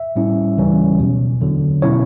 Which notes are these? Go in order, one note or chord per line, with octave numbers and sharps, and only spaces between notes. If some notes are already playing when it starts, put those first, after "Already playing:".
Already playing: E5
A2 G3 C#4 E4
D2 C#3 E3 G3 C#4
E2 B2 F#3
E2 D3 F#3
B2 F#3 C#4 E4 C#5